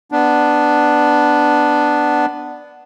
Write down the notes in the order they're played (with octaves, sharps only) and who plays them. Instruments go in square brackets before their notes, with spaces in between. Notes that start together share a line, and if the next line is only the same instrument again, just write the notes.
[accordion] B3 D4